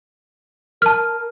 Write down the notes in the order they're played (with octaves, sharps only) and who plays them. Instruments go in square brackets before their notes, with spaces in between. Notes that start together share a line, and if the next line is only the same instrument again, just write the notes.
[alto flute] A#4 [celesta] A5 F6